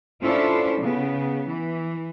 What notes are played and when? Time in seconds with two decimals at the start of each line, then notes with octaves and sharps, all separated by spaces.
0.23 C#4 D4 E4 F4 A4 C5
0.81 C#3 B3
1.48 E3